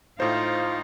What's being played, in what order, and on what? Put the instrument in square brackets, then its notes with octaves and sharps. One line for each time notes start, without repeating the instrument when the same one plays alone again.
[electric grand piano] A2 C5 [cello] D#4 F5 [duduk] F4